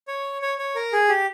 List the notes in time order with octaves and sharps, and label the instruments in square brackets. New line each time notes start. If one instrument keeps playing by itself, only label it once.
[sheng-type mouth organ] C#5
C#5
C#5
A#4
G#4
G4